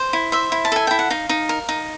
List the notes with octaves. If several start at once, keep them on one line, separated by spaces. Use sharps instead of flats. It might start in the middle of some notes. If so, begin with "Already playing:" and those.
Already playing: C5
E4
C5 E5
E4
A5
A4 G#5
E4 G5
F#5
D#4 F5
D#4
A#4
D#4